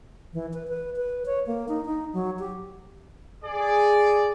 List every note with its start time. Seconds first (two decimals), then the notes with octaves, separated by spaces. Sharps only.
0.33 E3
0.53 B4
0.68 B4
0.97 B4
1.26 C#5
1.47 A#3
1.68 D#4
1.85 D#4
2.13 F#3
2.40 G4
3.44 G#4 D5